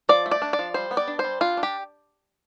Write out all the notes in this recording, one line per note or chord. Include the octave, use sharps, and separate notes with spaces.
F3 D5
A3
D5
D4
D5
F3
G3 C5
B3
D5
D4
C5
G3
D4 F4
D4
G4